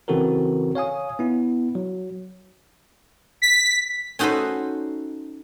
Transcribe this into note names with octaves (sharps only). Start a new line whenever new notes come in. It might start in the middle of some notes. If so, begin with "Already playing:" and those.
C#3 E3 C4 F#4 A4 A#4
C#5 F5 G#5 D#6
B3 E4
F#3
B6
C#4 D#4 F#4 A4 B4 C5